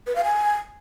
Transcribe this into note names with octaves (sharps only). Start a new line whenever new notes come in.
B4
F5
G#5